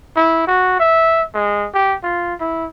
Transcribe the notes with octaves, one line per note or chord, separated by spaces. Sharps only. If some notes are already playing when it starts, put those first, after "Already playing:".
E4
F#4
E5
G#3
G4
F4
E4